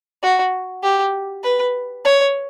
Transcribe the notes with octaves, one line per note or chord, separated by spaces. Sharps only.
F#4
G4
B4
C#5